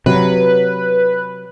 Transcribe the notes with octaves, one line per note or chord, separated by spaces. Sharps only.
C3 F#3 B4